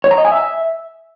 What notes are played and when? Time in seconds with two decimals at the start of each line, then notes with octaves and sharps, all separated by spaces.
0.04 C#5
0.11 A#5
0.18 D#5
0.25 G#5
0.32 E5